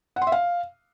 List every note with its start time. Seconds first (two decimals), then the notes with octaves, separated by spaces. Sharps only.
0.16 F#5
0.22 C6
0.27 E5
0.32 F5